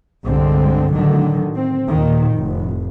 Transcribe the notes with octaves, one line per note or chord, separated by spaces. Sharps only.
C2 G2 D3 G#3 C4
A2 D3 D#3 F#3
C4
D#2 A#2 D#3
F1 A2